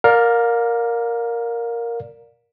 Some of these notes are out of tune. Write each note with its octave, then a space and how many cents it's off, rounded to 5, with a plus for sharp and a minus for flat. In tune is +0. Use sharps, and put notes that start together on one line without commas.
A#4 +0 D5 -5 F5 +30